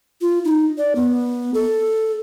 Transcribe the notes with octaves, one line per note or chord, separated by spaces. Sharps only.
F4
D#4
D5
B3
A4